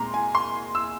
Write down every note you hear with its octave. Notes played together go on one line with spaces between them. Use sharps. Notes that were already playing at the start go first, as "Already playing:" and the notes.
Already playing: A#2 G#3 C4 A#5 C6
G#5
C6
E6